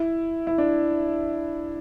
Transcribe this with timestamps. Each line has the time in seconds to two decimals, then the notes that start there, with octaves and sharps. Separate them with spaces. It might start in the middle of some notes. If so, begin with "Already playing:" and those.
Already playing: E4
0.47 E4
0.58 D4